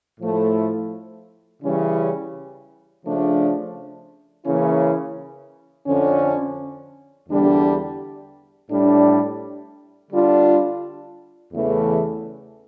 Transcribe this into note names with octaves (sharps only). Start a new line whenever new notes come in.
A2 F3 A3 E4
C#3 E3 G3 C#4 E4
C#3 F3 A3 D4
C#3 E3 A#3 C#4 E4
F2 D3 F3 C#4
E2 D3 G3 D4
A2 G3 D4
D3 G3 D4 F4
E2 C#3 E3 A3